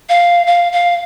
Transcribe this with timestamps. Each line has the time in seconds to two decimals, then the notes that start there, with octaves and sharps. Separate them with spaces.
0.09 F5
0.47 F5
0.72 F5